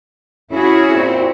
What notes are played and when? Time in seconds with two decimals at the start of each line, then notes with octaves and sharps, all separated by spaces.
0.51 C#4 E4 F#4 G#4
0.91 A#2 C4